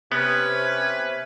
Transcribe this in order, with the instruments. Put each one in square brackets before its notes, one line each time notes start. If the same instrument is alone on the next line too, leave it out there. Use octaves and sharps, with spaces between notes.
[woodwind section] C3 [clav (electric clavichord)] B3 [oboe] C#4 [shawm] B4